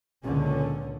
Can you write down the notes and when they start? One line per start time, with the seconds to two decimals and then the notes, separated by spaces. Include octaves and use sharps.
0.24 C#2 A#2 D3 C#4